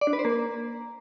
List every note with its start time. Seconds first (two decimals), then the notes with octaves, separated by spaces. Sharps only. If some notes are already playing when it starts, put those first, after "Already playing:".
0.01 D5
0.07 D4
0.13 B4
0.19 C5
0.25 A#3